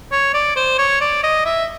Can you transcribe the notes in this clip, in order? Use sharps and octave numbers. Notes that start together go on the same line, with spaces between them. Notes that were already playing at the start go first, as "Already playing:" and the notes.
C#5
D5
C5
C#5
D5
D#5
E5